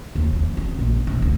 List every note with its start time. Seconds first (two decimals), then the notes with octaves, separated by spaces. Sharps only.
0.15 D#2
0.33 F3
0.57 C4
0.79 A#1
1.07 E1
1.22 D2